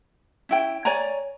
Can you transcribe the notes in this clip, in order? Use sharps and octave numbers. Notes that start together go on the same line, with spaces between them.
C#4 E4 G5
C#5 D5 G#5 A#5